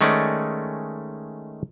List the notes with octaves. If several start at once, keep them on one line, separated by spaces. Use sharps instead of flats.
D#3 G#3 A3 C#4 D5